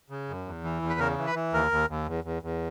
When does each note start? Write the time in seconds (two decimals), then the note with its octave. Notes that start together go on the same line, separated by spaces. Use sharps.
0.10 C#3
0.29 F#2
0.46 E2
0.64 E3
0.82 E2
0.90 B4
1.00 C#3 A#4
1.18 E3
1.27 B4
1.35 E3
1.53 D#2 A#4
1.71 D#2
1.89 D#2
2.07 E2
2.24 E2
2.43 E2